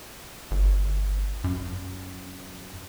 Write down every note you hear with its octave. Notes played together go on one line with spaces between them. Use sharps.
G1
F#2